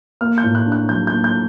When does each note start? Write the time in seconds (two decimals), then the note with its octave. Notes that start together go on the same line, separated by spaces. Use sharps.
0.21 A#3 F6
0.38 G6
0.44 A2
0.55 F#6
0.66 D4
0.72 F#6
0.89 F#3 G6
1.07 G6
1.13 A#3
1.24 G6